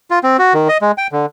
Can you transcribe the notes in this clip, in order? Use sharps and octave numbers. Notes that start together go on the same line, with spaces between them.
F4
C4
F#4
D#3
D#5
G#3
G5
D3